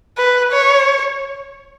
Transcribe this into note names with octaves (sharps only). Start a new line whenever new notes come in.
B4
C#5